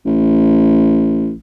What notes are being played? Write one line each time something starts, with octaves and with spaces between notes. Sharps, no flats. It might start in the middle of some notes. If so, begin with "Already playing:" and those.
A1